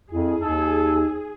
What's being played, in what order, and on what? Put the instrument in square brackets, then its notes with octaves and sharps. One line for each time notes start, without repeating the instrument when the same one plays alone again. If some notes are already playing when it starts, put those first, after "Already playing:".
[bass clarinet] F2 [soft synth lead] E4 [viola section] G#4
[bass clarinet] D#2 [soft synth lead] D#4 [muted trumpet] A4